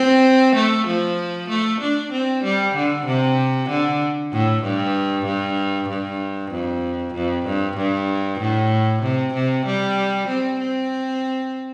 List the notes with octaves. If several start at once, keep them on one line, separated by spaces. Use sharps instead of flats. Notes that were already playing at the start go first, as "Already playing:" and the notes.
Already playing: C4
A3
F3
A3
D4
C4
G3
D3
C3
D3
A2
G2
G2
G2
F2
F2
G2
G2
A2
C3
C3
G3
C4
C4